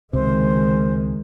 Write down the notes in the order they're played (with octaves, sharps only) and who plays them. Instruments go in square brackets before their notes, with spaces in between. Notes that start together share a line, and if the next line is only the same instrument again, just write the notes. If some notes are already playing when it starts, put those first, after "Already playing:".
[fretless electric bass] C#2 C3 [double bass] D#3 G#3 [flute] C5